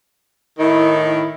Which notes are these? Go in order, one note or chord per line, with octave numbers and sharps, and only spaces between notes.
A2 D#3 E4
E4